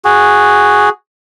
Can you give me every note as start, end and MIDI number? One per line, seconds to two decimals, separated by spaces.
0.05 0.89 66
0.05 0.89 68